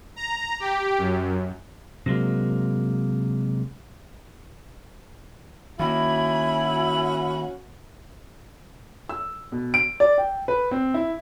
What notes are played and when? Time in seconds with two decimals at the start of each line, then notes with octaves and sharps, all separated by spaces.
0.16 A#5
0.60 G4
0.98 F#2
2.06 C3 F#3 G#3 A#3
5.79 D#3 A#3 C#4 E4 F#4 B5
9.09 E6
9.52 B2
9.74 D7
10.00 D5
10.18 G5
10.48 B4
10.71 C4
10.94 E4